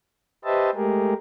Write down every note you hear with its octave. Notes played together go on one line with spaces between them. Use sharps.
G4 B4 C5 D#5 E5 A5
G#3 A3 G4 G#4 A#4